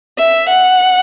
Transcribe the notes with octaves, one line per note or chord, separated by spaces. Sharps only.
E5
F#5